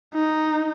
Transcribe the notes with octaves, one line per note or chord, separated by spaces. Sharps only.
D#4